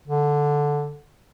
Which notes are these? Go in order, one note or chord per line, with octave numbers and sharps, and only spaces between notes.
D3